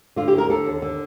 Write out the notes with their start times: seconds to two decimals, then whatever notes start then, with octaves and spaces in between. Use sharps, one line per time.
0.16 D3 F4
0.28 G4
0.33 D2
0.38 A#4
0.49 D3 A4
0.66 D#2
0.82 D3